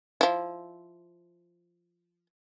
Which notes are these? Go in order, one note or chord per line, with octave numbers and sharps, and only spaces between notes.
F3 E4